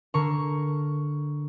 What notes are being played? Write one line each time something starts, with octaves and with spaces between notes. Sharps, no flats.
D3 A#4 C#6